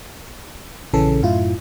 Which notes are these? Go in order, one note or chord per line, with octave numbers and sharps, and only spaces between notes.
A#1 C#3 E3 C#4 A4
F#2 A2 E4 F4